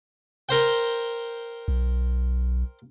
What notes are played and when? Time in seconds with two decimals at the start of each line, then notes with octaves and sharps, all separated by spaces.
0.49 A#4 C5 G5
1.68 B1